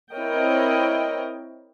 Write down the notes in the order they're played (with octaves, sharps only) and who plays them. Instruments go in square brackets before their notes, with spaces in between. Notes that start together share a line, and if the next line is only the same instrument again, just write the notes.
[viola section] C4 E4 A#4 C#5 D#5 G5